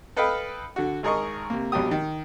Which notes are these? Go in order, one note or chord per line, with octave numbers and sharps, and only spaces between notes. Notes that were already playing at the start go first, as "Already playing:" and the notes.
A4 B4 D#5 F5 G5 B5
D3 F#4
G#1 G#4 A#4 D#5 C#6
C3 A#3
A#1 B2 F#3 G3 G4 D#6
D#3